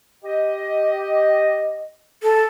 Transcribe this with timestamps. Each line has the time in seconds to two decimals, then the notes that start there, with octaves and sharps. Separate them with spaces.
0.24 G4 D#5
2.23 A4